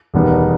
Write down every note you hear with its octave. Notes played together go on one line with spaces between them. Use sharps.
E1 E2 D#3 G3 B3